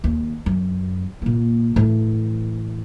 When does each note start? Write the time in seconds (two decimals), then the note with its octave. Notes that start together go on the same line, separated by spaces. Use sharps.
0.04 D#2
0.46 F#2
1.22 A#2 A#3
1.76 A2 E3